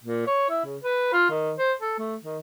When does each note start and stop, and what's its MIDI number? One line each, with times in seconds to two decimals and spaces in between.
0.04 0.25 46
0.27 0.49 73
0.49 0.64 64
0.65 0.77 49
0.83 1.09 71
1.13 1.26 65
1.30 1.53 51
1.58 1.73 72
1.81 1.97 69
1.99 2.16 57
2.24 2.38 51